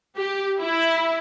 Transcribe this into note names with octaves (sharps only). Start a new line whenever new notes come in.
G4
E4